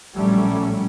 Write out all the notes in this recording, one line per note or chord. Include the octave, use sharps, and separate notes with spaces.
A#1 A2 F#3 G3 A3 C#4